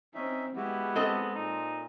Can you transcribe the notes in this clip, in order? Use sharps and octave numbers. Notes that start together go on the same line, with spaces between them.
C4 C#4 D#4 E5
G#3 B3 E4 F#4 G4
C4 A4 D#5
A#2 D#4